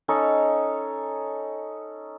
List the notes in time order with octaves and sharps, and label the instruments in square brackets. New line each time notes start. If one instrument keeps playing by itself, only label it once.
[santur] C#4 D#4 A4 C#5